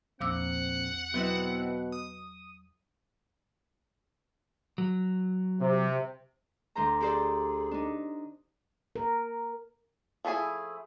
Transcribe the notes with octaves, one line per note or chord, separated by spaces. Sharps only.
A#1 E2 C4 F#5 D6 E6
B2 F#3 B3 C4 E4
D#6
F#3
C3
D2 C5 A#5
G4 G#4 C5 D5
D4 D#4
A#4
F3 A3 E4 G#4